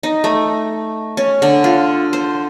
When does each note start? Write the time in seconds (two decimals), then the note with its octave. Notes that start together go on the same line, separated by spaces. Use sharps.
0.03 D#4
0.24 A3
1.17 C#4
1.42 D3
1.64 F4
2.13 C5